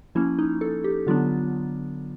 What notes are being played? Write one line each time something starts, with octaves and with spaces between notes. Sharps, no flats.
F3 A#3 C#4 E4
D#4
A4
G4
D3 F#3 B3 D4 F4